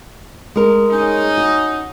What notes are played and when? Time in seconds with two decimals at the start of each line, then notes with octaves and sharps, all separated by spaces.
0.56 G#3 A#4
0.91 C#4 D#4
1.38 F#4